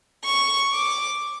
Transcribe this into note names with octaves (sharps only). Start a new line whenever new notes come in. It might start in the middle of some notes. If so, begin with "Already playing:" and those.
C#6
D6